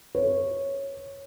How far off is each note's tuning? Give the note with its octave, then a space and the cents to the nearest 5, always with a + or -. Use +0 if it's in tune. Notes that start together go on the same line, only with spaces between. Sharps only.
C#5 -10